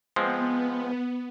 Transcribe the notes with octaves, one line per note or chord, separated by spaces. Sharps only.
F3 G#3 B3 C4